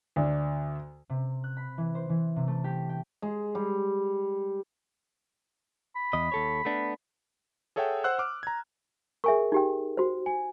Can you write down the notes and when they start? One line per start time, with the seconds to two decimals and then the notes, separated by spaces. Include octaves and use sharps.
0.16 D2 D4
1.09 C3
1.44 F#6
1.57 B5
1.78 E3
1.95 C5
2.09 E3
2.36 C3
2.48 A3
2.64 G4
2.89 G5
3.22 G#3
3.55 G3
5.96 B5
6.13 E2 D#5
6.32 D#2 A4 C#5
6.65 A3 B3 D4
7.76 G#4 A4 C#5 E5 F#5 G5
8.04 C5 F#5 E6 F#6
8.19 D6 F6
8.43 A#5 G#6
9.24 G#4 A#4 E5 G#5 C#6
9.52 D#4 G4 G5
9.97 F#4 C5
10.26 G#5